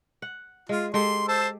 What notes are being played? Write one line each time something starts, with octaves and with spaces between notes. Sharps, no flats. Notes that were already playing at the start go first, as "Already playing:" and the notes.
F#5
G#3 F4
G#3 G4 A4 C6
C5 A5 E6